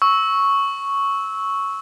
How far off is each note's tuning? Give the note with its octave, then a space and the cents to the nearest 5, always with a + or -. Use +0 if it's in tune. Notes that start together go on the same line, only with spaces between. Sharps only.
C#6 +0 E6 -15